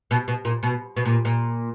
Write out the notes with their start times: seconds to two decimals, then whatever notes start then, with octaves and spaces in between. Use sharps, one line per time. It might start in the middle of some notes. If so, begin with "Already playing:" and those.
0.11 B2
0.28 B2
0.45 A#2
0.63 B2
0.96 B2
1.05 A#2
1.25 A#2